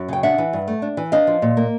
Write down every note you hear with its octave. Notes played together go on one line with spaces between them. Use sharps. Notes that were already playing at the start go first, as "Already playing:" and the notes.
Already playing: F#2
C#3 G5
D4 E5 F#5
E3
G2
A3
D4
E3
D4 D#5 F5
F3
A#2
A#3